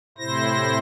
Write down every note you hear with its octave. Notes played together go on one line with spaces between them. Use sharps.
A2 C3 E4 C5 A#6